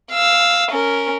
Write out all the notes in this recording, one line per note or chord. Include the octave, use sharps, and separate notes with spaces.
F5 E6
C#4 A#4